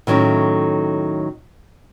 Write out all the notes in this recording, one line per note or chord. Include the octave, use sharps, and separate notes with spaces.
A2 D#3 F#3 C#4 E4